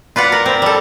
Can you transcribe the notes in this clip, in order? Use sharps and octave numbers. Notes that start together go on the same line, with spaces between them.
F4 B4 D5 F#5
A#4
C4
G3 A4